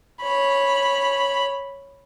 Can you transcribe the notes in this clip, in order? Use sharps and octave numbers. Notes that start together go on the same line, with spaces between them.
C#5 B5